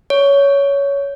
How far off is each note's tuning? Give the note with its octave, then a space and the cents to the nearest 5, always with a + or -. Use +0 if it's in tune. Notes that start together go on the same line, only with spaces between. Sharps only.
C#5 +15